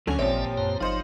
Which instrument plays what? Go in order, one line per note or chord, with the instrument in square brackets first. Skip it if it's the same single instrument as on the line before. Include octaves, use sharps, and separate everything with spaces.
[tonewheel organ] D2 [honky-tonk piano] D3 C#4 [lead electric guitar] F#3 C#5
[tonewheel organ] A1 D5 E5 [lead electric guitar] A#2 G4 [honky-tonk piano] F3 C4 [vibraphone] C#5
[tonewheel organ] F#2 C5 A#5
[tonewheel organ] G1 F#3 D#4 [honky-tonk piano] F4 C5 D#5